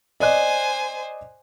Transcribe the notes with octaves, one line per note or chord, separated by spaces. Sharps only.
C5 D5 D#5 G#5 F#6